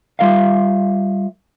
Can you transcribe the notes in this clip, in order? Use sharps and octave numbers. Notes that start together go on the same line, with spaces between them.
G3 F4 A#4 E5 F5